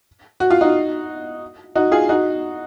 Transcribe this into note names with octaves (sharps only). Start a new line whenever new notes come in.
F#4
F4
D#4 F#4
D#4 F#4
F4 G#4
D#4 F#4